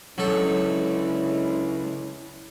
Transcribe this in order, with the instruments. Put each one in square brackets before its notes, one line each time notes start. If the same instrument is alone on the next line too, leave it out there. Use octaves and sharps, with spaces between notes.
[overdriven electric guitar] C#2 [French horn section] D3 G#3 C#4 [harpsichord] F#3 A4 [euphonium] E4